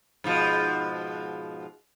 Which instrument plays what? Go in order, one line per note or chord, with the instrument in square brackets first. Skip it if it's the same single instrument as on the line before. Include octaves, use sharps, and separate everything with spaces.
[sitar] G#2 B2 F3